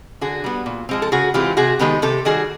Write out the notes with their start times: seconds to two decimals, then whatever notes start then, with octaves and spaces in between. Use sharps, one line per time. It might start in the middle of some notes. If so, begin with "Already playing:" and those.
0.21 D3 F#4 G#4
0.44 G3 B3
0.66 A#2
0.89 F3 G#3 C4
1.02 A4
1.12 C#3 F#4 G#4
1.34 E3 G#3 C4 F4 G4
1.57 C3 F#4 G#4
1.79 D#3 G#3 B3 G4 A4
2.02 C3 G4 A4
2.25 D#3 G3 F#4 G#4